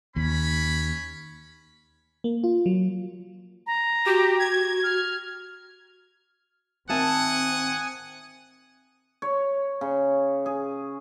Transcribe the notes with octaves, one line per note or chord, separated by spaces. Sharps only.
D#2 C#4 B5
A#3
F4
F#3
A#5
F#4 G4
G#6
F6
D#3 C4 E5 F#5 G#5 A5 D#6
C#5
C#3
G#4